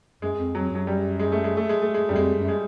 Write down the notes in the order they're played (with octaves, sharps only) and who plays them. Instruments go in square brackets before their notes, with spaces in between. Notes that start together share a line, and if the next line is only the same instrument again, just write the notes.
[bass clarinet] F#2 [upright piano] G#3
[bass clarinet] F2
[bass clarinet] F2 [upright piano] F#3
[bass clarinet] F#2 [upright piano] F#3
[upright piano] G3
G#3
A3
G#3
A3
G#3
A3
G#3
[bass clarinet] F#2 [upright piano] G3
[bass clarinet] F2 [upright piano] G#3
[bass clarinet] F#2
[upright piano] G#3